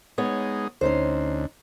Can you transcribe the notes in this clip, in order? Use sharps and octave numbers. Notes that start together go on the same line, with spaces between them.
G#3 B3 D#4 C#5
D2 C#4 D#4 C5